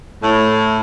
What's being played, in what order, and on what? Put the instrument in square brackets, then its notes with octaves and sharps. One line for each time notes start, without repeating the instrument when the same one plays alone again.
[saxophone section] A2